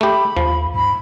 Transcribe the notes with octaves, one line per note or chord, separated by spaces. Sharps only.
A3 G4 B5
D#2 F3
G#2 B5